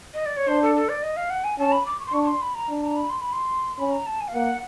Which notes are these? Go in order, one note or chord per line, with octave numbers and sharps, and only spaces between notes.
D#5
D5
C#5
D4 C5
A4
A4
D5
D#5
F5
F#5
G#5
C#4 A5
B5
D6
C#6
C6
D4 C#6
C#6
C6
B5
A#5
D4
A#5
B5
C6
B5
C6
C#4 B5
A#5
A5
G#5
F5
A#3 F#5